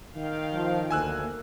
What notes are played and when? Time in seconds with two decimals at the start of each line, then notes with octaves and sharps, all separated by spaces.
0.16 D#3 F5 G5
0.53 F3
0.91 D2 A#3 G#5 E6 F#6